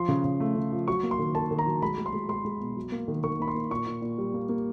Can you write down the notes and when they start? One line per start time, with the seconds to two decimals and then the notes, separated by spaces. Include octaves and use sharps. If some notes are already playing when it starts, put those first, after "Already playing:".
Already playing: F3 C6
0.09 C#3
0.24 C#3
0.40 A3
0.56 C#3
0.72 F3
0.88 F#3 C#6
1.03 A#3
1.11 C6
1.19 D#3
1.35 D#3 A5
1.51 D#3
1.59 A#5
1.67 F#3
1.82 G#3 B5
1.98 G#3
2.06 C6
2.13 G#3
2.29 G#3 C6
2.45 G#3
2.60 B2
2.77 F#3
2.92 A#3
3.08 D#3
3.24 D#3 C#6
3.40 A#3 B5
3.48 C6
3.55 A#3
3.71 A#2 C#6
3.86 A#2
4.02 A#2
4.18 G3
4.34 A#3
4.49 A#3